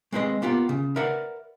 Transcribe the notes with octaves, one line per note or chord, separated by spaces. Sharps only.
G#3 C4 G#4 B4 D#5
A#3 B3 F4 G4
C#3
A#4 B4 D5 E5 F#5